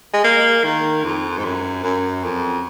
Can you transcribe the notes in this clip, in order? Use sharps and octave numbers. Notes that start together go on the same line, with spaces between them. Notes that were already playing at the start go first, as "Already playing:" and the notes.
G#3
A#3
D#3
F2
G#2
F#2
F#2
F2